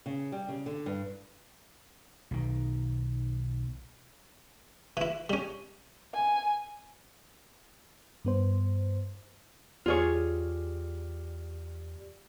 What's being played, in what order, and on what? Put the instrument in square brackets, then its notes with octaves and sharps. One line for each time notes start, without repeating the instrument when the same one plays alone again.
[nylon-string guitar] C#3
G3
C#3
D3
G2
[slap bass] B1 D#3
[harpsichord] E3 E4
G3 C#4
[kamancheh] G#5
[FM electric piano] G2 B3 C5
[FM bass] E2 [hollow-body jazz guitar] F4 G#4 C#5 [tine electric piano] G4 D5 F6